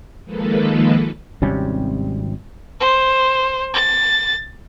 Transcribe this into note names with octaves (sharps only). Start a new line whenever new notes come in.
D#3 F3 G#3 A#3 A4 B4
G#1 C3 G3 C#4
C5
A6